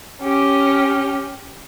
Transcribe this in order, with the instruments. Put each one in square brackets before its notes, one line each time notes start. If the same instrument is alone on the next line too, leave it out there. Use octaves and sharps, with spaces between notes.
[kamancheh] C#4 G4